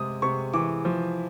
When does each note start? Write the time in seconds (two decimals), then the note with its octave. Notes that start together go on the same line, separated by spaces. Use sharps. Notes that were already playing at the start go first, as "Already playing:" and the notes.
Already playing: C3 G#3 D#6
0.22 C3 C#6
0.54 E3 D6
0.85 F3